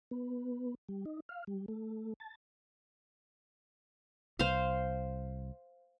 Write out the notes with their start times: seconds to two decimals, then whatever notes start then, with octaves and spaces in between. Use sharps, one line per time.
0.11 B3
0.89 G3
1.05 D#4
1.29 F5
1.47 G3
1.68 A3
2.20 A5
4.39 C2 C5 F5